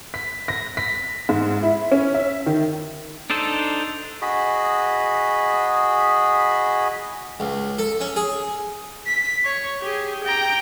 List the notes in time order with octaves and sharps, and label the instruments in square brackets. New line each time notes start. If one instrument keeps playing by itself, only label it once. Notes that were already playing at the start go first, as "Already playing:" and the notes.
[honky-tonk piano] B6
A#6
B6
G#2
E4
C#4
E5
D#3
[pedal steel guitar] D4 D#4 A4 C5
[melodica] F#4 G#4 D#5 B5
[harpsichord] C#2
A4
C#4
G#4
[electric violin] B6
C#5
G4 G#4
G5 A#5